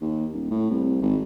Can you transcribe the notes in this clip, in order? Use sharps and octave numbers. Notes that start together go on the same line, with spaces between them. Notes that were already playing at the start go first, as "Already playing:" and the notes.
D#2
D#1
A2
C2
G#1